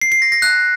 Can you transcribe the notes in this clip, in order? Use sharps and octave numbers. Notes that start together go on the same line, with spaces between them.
C7
C7
A#6
A#6
F#6